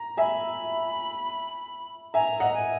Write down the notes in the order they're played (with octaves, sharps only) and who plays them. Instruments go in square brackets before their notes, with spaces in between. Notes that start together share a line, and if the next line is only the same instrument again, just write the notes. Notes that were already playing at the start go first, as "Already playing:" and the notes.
Already playing: [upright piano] A#5
[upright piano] E5 G#5 [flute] B5
[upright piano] E5 G#5 [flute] A#5
[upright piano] D#5 F#5
[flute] G#5